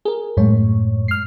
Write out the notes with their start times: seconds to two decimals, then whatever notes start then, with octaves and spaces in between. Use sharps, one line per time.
0.05 G#4 A#4
0.37 F#2 A2 G#3 C#5
1.08 F6 C7